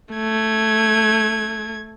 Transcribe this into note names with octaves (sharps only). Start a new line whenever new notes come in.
A3 G#6